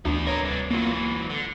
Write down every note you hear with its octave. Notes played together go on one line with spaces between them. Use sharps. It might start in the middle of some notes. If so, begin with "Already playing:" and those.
D2 E3 B3 D4
A#4 B4 C#5 G#5
C2 D4
E3 F#3 A#3 F4
D3